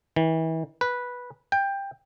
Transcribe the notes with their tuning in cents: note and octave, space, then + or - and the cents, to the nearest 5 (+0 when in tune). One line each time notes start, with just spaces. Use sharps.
E3 -35
B4 -10
G5 +15